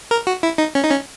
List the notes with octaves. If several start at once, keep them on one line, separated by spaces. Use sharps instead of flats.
A#4
F#4
E4
D#4
C#4
D#4
C#4